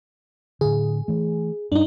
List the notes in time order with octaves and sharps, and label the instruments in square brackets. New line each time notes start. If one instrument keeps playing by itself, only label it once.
[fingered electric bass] A2 D3 [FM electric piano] G#4
[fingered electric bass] E3 A3
[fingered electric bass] G2 [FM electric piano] D4 D#4